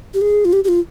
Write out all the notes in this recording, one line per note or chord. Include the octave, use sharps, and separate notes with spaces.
G4
G#4
F4
G4
G4
F4